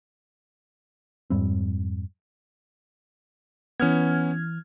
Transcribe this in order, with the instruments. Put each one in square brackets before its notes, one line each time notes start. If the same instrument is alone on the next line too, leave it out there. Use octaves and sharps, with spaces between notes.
[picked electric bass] F2 G#2 G3 C4
[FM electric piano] E3 F6 G#6 [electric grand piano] B3 C#4